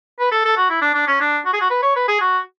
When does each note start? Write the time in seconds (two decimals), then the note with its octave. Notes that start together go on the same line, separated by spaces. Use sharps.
0.19 B4
0.32 A4
0.45 A4
0.57 F#4
0.70 E4
0.82 D4
0.94 D4
1.07 C#4
1.21 D4
1.45 F#4
1.53 G#4
1.61 F#4
1.70 B4
1.82 C#5
1.96 B4
2.08 G#4
2.21 F#4